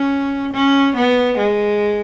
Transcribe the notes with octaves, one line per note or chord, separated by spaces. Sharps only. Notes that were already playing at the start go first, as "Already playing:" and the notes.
Already playing: C#4
C#4
B3
G#3